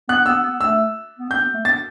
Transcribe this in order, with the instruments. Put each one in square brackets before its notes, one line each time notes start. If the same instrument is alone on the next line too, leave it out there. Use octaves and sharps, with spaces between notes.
[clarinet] B3 [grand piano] F#6
[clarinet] B3 [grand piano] E6
[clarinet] B3
[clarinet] A3 [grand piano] E6
[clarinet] B3
[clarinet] C4 [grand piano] G6
[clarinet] B3
A3
[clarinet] B3 [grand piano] A6